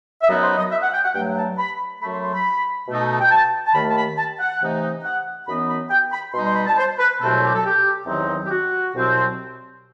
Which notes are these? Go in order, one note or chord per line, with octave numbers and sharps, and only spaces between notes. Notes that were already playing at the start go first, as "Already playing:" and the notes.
E5
F#2 F#3 B3 D#4 D#5
C5
D#5
E5
F#5
G5
F#5
G2 F#3 A3 G5
A5
B5
F#2 F#3 A3 B5
C6
C6
B5
B2 A3 D#4
G5
A5
A5
D#2 D#3 A3 B5
A5
B5
A5
F#5
C3 E3 A3 D#4
F#5
F#2 E3 B3 D#4 B5
B5
G5
B5
B2 G3 D#4 C6
C6
B5
A5
C5
B4
C2 B2 F#3 A3 C4 A4
G4
A4
G4
E2 D#3 F#3 C4 D#4
G4
F#4
C2 B2 F#3 C4